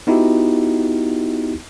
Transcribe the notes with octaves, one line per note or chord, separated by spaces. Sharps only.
B3 D#4 E4 F#4 G4